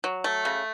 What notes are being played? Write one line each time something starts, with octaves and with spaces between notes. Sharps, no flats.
F#3
A3
C#3